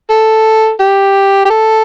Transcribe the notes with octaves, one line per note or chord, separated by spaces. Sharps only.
A4
G4
G4
A4